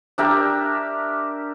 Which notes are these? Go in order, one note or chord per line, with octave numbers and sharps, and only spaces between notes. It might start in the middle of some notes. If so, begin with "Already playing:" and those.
D4 G4 A#4 E5